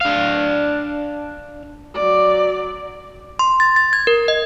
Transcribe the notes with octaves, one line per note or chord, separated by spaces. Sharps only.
D4 F5
F#3 D5
C6
A6
A6
G#6
A#4
D#5